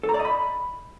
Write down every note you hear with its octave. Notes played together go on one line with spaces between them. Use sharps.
A4
A#5
D5
D#5
B5